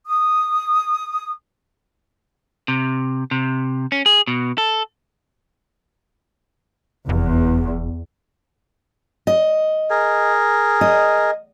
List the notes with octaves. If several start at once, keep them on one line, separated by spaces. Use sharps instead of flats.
D#6
C3
C3
C#4
G#4
B2
A4
F1 E2
D#5
G#4 A#4
D#5